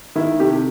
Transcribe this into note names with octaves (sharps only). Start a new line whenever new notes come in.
D#3 E4
C3 G4 A4